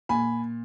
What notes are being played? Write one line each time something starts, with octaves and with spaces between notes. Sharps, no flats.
A#2 G#5 B5